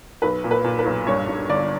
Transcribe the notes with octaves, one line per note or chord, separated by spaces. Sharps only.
B1 B4
A#2
B4
A#2
B4
B1
G2 C#5
G2
G1 D5